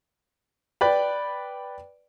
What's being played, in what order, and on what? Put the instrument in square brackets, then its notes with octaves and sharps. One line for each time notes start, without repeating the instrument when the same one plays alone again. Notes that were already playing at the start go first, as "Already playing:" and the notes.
[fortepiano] B4 D5 G5 B5